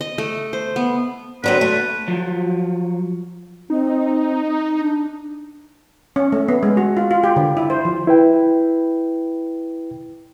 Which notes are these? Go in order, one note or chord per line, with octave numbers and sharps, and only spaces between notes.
D#5
A3
C5
B3
D3 F#3 C4 B4
A3
F3 F#3
C4 D#4
D4
C#4
A3
B3
G#3
F#4
F4
F4
G4
D3
E4
C5
F3
E4 B4 G5